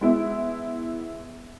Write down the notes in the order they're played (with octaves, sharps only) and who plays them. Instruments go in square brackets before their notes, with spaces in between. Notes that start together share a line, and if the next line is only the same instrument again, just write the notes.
[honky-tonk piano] G#3 B3 E4